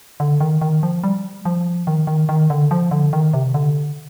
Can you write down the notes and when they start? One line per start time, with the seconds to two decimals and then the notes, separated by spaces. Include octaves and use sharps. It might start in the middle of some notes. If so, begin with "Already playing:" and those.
0.20 D3
0.40 D#3
0.61 D#3
0.83 F3
1.04 G3
1.45 F3
1.87 D#3
2.07 D#3
2.29 D#3
2.50 D3
2.71 F3
2.91 D3
3.13 D#3
3.34 C3
3.54 D3